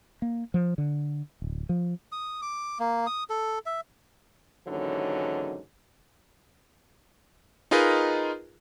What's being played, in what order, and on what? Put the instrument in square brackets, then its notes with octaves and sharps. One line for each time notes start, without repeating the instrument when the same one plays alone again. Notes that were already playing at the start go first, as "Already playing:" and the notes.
[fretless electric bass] A#3
F3
D3
D1
F3
[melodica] D#6
D6
A#3
D#6
A4
E5
[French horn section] D#2 G#2 D3 E3 F#3 C#4
[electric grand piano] D#4 F4 G#4 A#4 B4 D#5